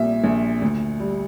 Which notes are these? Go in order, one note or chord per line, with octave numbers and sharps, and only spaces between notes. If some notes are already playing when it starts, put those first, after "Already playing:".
Already playing: A#1 A#2 G3 E5
A#1
D2
G3